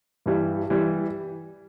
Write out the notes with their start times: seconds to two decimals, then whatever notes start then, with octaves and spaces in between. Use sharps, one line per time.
0.26 G2 E3 G3
0.70 E3 G3